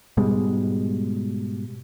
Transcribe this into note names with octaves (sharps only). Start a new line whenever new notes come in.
G#2 B2 G3 G#3